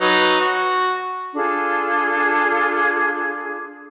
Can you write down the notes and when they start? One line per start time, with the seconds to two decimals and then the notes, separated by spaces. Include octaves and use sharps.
0.01 F#3 D#4 B4
0.40 F#4
1.35 D4 F4 G#4 A4